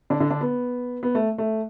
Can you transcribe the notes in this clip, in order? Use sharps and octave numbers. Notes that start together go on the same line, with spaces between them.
D3 D4
D3 D4
D3 D4
B3
B3
A3
A3